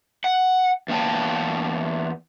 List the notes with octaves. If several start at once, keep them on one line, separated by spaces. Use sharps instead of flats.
F#5
E2 A#3 G5 A5